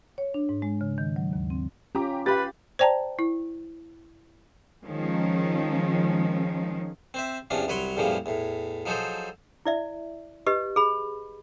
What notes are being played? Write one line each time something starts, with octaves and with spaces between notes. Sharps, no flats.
C#5
D4
G#2
G#3
C#3
D#3
F#3
D#2
C4
C#4 F4 G4 A#5 D6
G4 B4 F5 B5 A6
C5 D5 G5 A5 A#5
E4
D#3 F3 G#3 C#4
C4 C5 E5
E2 C3 F3 C#4 D4
C2 F#3 B4 C#5 C6
E2 A2 C#3 F3 G3 A#3
E2 A2
F3 F#3 D#4 G#4 A4 C5
E4 D5 E5
G4 B4 D#5
G#4 B5